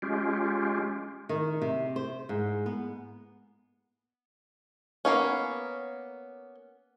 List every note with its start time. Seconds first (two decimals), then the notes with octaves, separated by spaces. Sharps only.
0.02 G#3 C#4 F4 G4
1.29 D#3
1.62 C3
1.96 C5
2.29 G#2
2.66 B3
5.05 A#3 B3 C#4